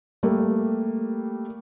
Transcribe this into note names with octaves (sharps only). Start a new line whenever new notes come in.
G3 A3 A#3